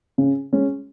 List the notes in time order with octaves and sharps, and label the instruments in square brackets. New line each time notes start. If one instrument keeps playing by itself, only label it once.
[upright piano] C#3
G#3 C#4